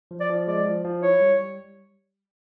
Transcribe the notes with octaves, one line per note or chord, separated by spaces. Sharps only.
F3
D5
F3
G#3 D5
F3
F3
E4 C#5
G3
G3